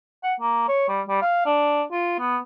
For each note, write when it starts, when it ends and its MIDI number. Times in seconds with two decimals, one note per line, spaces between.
0.23 0.34 78
0.40 0.64 58
0.68 0.88 73
0.88 1.01 55
1.08 1.19 55
1.22 1.43 77
1.46 1.83 62
1.92 2.16 65
2.19 2.37 59